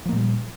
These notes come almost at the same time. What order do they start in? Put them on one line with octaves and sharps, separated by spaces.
F3 A#3 A#2 G3